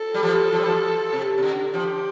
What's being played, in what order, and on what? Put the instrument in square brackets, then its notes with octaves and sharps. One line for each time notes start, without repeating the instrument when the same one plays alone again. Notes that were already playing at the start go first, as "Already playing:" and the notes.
Already playing: [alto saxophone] A4
[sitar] G3
F3
F3
G3
F3
C3
C3
D3
[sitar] F3 [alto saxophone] G4